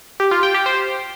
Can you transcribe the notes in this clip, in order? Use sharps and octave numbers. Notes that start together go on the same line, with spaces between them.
G4
F4
G5
G4
C5